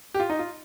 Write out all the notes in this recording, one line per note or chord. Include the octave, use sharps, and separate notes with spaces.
G4
F4
D#4
F4